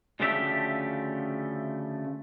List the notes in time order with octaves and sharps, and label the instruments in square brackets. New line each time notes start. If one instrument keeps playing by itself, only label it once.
[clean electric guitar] D2 C#3 F3 A3 G4 E5